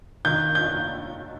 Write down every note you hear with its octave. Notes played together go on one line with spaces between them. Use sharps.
D#3 G6
G6